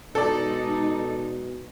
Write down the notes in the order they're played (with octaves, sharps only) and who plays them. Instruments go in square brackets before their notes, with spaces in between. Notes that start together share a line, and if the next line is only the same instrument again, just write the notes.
[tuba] B2 [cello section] G#3 D#4 [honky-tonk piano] A4 D5